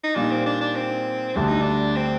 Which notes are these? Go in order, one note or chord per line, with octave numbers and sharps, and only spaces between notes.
D#4
A#2 G3 A#3 D4 D#4
C4
D4
D4
C4
D2 D3 G3 D4
D#4
D4
C4